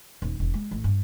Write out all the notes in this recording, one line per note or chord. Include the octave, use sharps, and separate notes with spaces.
D#1
E1
G#3
A1
G2